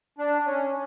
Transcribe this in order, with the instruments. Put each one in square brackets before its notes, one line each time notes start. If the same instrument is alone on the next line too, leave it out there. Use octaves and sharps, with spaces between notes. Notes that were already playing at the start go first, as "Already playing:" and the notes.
[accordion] D4
C#4